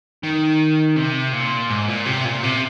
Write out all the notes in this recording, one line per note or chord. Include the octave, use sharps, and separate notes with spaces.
D#3
C3
A#2
G#2
A#2
C3
A#2
C3